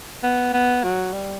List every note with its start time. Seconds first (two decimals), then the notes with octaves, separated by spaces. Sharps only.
0.23 B3
0.54 B3
0.84 F#3
1.13 G3